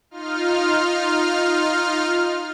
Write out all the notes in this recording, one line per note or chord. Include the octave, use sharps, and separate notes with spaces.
D#4 F4 F6